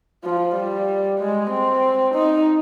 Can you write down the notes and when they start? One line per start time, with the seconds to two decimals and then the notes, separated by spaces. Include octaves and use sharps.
0.24 F3
0.56 G3
1.19 G#3
1.51 C4
2.14 D#4